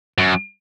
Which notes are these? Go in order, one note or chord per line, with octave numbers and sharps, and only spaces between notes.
F#2